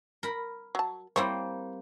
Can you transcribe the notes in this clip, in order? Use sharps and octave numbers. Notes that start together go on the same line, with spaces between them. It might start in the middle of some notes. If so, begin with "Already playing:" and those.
A#4 B5
F#3 A5
G3 A#3 C4 E4 C5 C#5